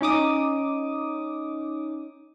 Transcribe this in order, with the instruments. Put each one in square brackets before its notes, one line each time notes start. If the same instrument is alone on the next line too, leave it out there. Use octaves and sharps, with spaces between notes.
[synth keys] C#4 D#4 D6 D#6